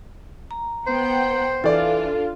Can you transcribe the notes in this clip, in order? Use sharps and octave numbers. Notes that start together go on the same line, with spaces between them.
A#5
B3 C5 F#5 G5
E3 D4 F4 A4 D5